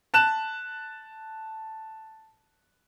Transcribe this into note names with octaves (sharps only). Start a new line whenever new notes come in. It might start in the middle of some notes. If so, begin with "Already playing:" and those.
A5 F#6 E7